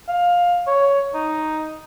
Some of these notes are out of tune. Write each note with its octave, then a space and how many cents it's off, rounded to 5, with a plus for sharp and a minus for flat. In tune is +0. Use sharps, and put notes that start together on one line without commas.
F5 +15
C#5 +10
D#4 +0